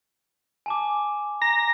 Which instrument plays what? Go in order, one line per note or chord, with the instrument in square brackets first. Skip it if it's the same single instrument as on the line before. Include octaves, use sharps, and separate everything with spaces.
[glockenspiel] G#5 A5 D6
[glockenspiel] A#5 [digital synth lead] A#6